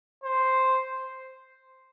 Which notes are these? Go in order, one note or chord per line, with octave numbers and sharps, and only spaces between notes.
C5